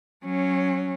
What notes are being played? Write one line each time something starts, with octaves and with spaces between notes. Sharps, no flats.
F#3 C#4